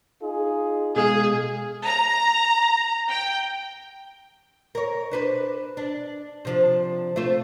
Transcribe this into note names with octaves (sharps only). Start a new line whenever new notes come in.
D#4 F4 G#4
B2 G#3 G#4 F5
A#5
G5
A#4 C#5
D4 B4 C5
D4
C3 F3 D4
A3 F4 C5